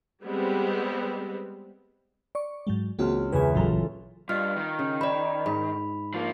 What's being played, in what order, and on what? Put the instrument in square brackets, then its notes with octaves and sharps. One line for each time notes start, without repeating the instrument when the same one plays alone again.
[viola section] G3 G#3 B3 C4
[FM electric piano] D5 C#6
G#2 F#3 G#3
[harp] C#2 F6 [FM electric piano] A#3 C4 F#4
[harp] E2 C#3 E4 [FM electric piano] B4 G#5
[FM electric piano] A1 A#2 F#3 [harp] F4 A4 A#5
[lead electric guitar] G2 [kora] F4 [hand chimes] D#5 F6
[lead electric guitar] D#3
[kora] C#3
[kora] C5 [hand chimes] D5 B5
[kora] G#2 [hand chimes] B5
[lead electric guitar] F3 A#3